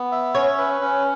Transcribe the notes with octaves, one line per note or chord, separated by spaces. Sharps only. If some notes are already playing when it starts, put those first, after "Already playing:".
Already playing: B3
E5
C#4 C#5
B4
C#4